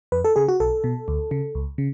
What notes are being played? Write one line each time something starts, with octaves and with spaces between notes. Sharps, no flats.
F2 B4
A4
C#3 G#4
F#4
B1 A4
B2
D2
C#3
C#2
C#3